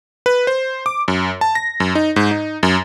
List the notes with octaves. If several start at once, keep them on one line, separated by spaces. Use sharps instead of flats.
B4
C5
D6
F#2
A5
A#6
F#2
D#4
G#2
D#4
F#2